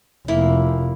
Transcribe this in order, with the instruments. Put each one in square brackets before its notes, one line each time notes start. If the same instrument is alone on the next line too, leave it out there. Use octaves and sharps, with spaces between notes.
[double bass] F1 [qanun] A#3 E4